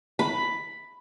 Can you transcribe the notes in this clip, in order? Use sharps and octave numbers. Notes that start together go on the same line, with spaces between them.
B5